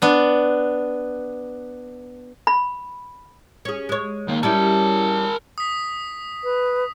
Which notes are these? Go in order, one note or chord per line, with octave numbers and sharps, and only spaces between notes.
B3 D4
B5
C#4 G#4
G#3 C#5
D#3 A#3
G3 C#4 E4 A#4 A5
D#6 B6
B4